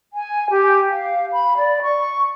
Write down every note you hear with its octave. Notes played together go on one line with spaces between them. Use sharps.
G#5
G4
F5
B5
D5
C#6